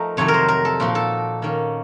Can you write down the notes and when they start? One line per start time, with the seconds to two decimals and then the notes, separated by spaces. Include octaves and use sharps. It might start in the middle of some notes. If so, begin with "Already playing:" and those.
Already playing: F3 A3 D#4 A#4
0.17 F2 C3 D#3 F#3 C#5
0.28 A#4
0.34 C5
0.48 A#4
0.65 A4
0.80 A#2 F3 A#3 D#4 F#4
0.95 A4
1.42 D#3 A#3 C#4